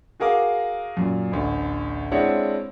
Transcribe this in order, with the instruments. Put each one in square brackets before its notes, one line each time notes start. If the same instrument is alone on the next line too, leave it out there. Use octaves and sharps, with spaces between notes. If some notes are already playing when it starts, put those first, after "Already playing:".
[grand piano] F#4 G#4 A#4 F5 D6
F#2 A#2
A1 D2
G#3 C4 D4 E4 C#5 F#5